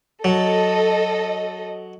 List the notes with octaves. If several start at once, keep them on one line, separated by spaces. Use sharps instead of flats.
F#3 A4 D#5